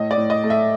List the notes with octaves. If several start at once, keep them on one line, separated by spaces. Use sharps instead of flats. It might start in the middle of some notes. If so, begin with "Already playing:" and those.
Already playing: A2 D#5
D5
A2
D#5
A3
E5